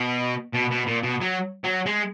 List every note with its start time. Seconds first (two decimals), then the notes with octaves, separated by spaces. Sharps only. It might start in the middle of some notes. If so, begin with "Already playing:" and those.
Already playing: B2
0.53 B2
0.71 B2
0.86 A#2
1.03 B2
1.20 F#3
1.64 F#3
1.86 G#3